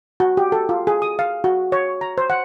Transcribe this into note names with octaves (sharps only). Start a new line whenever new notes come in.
F#4
G4
A4
F4
G#4
D#6
F5
F#4
C#5
A#5
C5
F#5